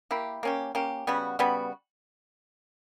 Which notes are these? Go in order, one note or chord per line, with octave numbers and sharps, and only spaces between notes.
A#3 E4 G4
A#3 C#4 G4
A#3 C#4 G4
C#3 G3 B3 F#4
C#3 G3 B3 F#4